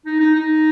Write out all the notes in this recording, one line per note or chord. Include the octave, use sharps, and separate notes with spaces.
D#4
D#4
D#4